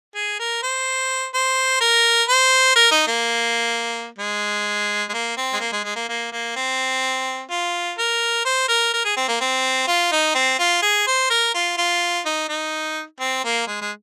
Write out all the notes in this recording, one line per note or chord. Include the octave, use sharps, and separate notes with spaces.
G#4
A#4
C5
C5
A#4
C5
A#4
D#4
A#3
G#3
G#3
A#3
C4
G#3
A#3
G#3
G#3
A#3
A#3
A#3
C4
F4
A#4
C5
A#4
A#4
G#4
C4
A#3
C4
F4
D#4
C4
F4
G#4
C5
A#4
F4
F4
D#4
D#4
C4
A#3
G#3
G#3